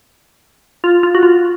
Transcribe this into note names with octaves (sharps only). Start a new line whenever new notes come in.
F4
F4
F#4
F4